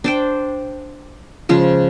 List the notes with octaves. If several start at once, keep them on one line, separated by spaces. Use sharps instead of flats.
D4 C5 G5
C#3 F3 G#3